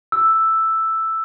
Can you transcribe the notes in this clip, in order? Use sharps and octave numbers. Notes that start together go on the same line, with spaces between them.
E6